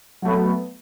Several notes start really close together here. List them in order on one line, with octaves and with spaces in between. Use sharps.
F#3 A3 B3